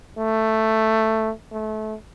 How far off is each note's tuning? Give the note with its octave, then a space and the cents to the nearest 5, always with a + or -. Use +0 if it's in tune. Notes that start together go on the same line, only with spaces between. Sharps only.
A3 +5
A3 -25